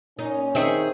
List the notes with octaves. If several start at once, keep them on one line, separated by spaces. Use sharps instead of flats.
A#2 C#4 D#4
D#3 C4 G#4 E5